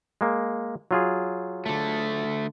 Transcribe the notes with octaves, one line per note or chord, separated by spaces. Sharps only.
G#3 A#3
F#3 F4 G#4
D3 A3